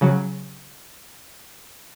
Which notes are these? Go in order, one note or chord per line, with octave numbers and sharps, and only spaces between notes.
C#3 F#3